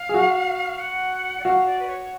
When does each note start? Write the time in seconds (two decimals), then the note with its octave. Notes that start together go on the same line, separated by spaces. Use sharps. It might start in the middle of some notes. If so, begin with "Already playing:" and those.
Already playing: F5
0.09 G#4
0.14 F#4
0.79 F#5
1.40 D5
1.44 F#4 F5
1.66 D5
1.79 B4
1.87 C#5